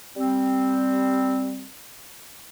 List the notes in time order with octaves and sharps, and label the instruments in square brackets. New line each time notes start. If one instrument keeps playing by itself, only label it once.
[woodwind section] G3 C4